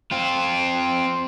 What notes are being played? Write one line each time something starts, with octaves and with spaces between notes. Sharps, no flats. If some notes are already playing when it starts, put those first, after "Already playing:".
C4 F4